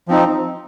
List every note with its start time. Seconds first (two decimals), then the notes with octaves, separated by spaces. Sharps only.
0.08 F3 C4 D#4